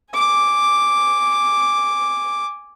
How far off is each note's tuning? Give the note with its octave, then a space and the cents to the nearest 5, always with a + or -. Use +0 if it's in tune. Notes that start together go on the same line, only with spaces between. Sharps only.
G#5 -10 D6 +0